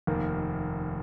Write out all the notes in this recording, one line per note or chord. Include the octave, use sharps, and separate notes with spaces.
F1 D#2 D#3 A#3